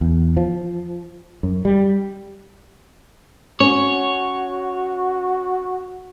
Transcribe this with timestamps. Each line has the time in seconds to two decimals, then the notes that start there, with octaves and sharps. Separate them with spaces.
0.01 E2
0.37 F3
1.43 F#2
1.65 G3
3.60 C#4 F#4 C#5